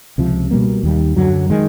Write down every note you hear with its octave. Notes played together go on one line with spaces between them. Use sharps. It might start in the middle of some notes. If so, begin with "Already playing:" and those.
C#2 C3 F3
B2 G3 A#3
D#2 D#3 G3
F#2 D3 F#3
D#3 G#3